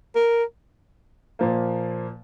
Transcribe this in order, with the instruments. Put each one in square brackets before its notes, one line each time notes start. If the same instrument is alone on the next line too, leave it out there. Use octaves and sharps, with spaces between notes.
[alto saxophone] A#4
[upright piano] A#2 F3 A#3